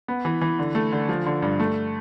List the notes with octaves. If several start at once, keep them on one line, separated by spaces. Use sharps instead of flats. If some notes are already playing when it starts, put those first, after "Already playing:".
B3
E3
E3
D3
A3
D3
F3
D3
G2
A3